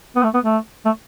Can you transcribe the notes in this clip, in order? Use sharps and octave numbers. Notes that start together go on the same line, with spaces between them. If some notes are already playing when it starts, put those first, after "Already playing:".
B3
A3
B3
A3
A3